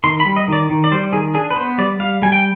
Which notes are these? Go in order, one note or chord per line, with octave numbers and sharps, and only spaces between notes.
D#3 C6
B5
G3
D#5
D#3 D5
D#3
D5
G3 C5
D#3 G#4
D4 G#4
B4
B3 C5
G3 D5
G3 F5
G3 G#5
G5